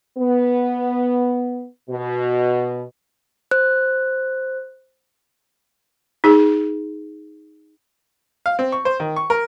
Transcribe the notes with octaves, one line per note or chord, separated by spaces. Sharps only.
B3
B2
C5 F#6
D#4 G#4
F5
C4
C#6
C5
D#3
C#6
A#4